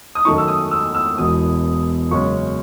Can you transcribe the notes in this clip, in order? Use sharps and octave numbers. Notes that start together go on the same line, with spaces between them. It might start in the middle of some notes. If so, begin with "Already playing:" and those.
D#6
F#2 D#3 A3 D#4 C#6
E6
D#6
E6
E6
E1 E2 B2 D#6
F#2 C#3 G#3 C#4 C#6